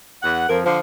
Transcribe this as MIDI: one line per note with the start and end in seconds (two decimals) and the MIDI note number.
0.23 0.47 40
0.23 0.47 78
0.49 0.61 41
0.49 0.61 53
0.49 0.59 70
0.65 0.79 50
0.65 0.79 53
0.65 0.78 72